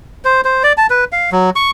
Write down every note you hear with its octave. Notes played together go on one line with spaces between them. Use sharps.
C5
C5
D5
A5
B4
F5
F#3
C#6